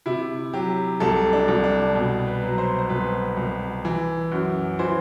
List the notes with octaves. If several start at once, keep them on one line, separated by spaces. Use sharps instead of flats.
C3 E4
F#3 G4
C2 A4
D4
C2
D4
B2
B4
F#3
C5
C5
C2 B4
C2
E3
F#2
E3 C5